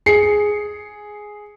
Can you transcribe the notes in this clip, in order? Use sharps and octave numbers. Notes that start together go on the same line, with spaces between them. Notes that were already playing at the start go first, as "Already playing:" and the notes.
G#4 C7 C#7